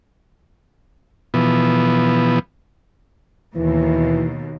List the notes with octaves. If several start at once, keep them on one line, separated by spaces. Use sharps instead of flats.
B2 E3 F3 B3
D#2 B2 E3